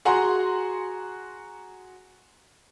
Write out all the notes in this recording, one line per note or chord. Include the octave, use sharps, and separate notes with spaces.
F#4 G#4 F#5 G#5 A#5 C6